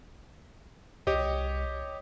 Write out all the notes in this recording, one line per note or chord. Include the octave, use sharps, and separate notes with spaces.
C2 G4 C#5 D#5